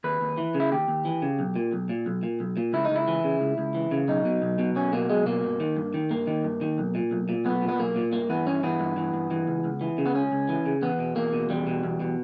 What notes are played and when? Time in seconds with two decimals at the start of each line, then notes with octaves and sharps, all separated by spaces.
0.04 D#2 B4
0.21 D#2
0.38 E3
0.54 C#3
0.60 E4
0.71 D#2 G4
0.88 D#2
1.05 E3
1.22 C#3
1.39 B1
1.56 A#2
1.72 B1
1.89 A#2
2.06 B1
2.23 A#2
2.40 B1
2.57 A#2
2.73 C#2 E4
2.85 D#4
2.90 C#2
2.96 E4
3.08 E3
3.24 C#3
3.41 C#2
3.58 C#2
3.75 E3
3.91 C#3
4.08 B1 D#4
4.25 B2
4.42 B1
4.59 B2
4.75 B1 C#4
4.93 B2 A#3
5.09 B1 G#3
5.26 B2 A#3
5.43 G2
5.60 D#3
5.77 G2
5.94 D#3
6.10 G2 A#3
6.27 D#3
6.44 G2
6.61 D#3
6.78 B1
6.95 A#2
7.11 B1
7.29 A#2
7.45 B1 B3
7.62 A#2
7.68 B3
7.79 B1 A#3
7.96 A#2
8.13 G2 A#3
8.29 E3 B3
8.46 G2 C#4
8.63 E3 B3
8.80 G2
8.97 E3
9.14 G2
9.31 E3
9.47 C#2
9.64 C#2
9.81 E3
9.98 C#3
10.06 B3
10.15 C#2 C#4
10.32 C#2
10.49 E3
10.66 C#3
10.82 E2 B3
10.99 B2
11.16 E2 A#3
11.33 B2
11.50 E2 G3
11.67 B2
11.83 E2
12.00 B2